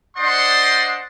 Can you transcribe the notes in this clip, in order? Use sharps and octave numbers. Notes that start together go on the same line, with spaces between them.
D4 C5 D5 D#5 F#5 C6